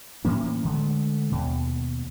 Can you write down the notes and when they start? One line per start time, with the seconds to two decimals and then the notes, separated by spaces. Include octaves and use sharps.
0.25 A2 E3 A#3 C#4
0.65 D3 G#3 A3
1.32 D#2 B2